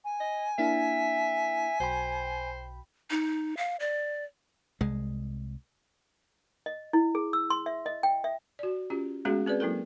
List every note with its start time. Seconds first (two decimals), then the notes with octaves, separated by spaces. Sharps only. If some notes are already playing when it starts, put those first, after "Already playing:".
0.05 G#5
0.20 D#5
0.58 A#3 D4 E4 E5
1.80 B1 C5 G5 B5
3.11 D#4
3.57 F5
3.80 D5
4.81 C2 G#3
6.66 D#5
6.93 E4
7.15 G#4
7.33 E6
7.50 C6
7.66 E5
7.86 D#5
8.03 G5
8.24 E5
8.59 F#4 D5
8.90 C#4 F4 G4
9.25 G#3 A3 B3 C#4 F#4 G#4
9.46 C4 G#4 B4 D5
9.60 F#3 A#3 E4 A4 A#4